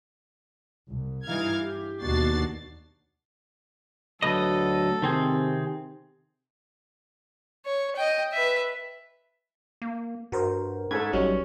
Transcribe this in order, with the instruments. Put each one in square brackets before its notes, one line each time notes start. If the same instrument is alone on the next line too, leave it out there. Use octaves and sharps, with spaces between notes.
[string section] C2
G2 E3 D#4 F5 F6 G#6
G4
D#2 B2 D4 F#4 A6 C7
[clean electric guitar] D2 B4 D#5 [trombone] F#3 [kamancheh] A4
[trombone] C3 [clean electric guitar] D#3 C4 G#4
[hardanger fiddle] C#5
D#5 G5
B4 E5
[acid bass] A#3
[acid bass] G2 [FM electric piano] F#4 A#4 C5
[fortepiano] G#2 A3 A4 [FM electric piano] B5 G#6
[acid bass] A1 [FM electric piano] F#3 G3 D#4 [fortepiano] C#4